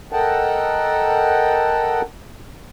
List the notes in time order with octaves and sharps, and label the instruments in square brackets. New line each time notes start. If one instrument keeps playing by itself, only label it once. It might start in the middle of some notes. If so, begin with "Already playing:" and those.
[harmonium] A4 A#4 D#5 F#5 G5 A5